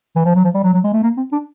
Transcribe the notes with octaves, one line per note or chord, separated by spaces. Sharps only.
E3
F3
F#3
F3
G3
F#3
F#3
G#3
A3
A#3
C4
D4